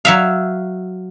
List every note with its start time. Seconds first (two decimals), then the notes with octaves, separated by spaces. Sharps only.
0.05 F#3 E5 F5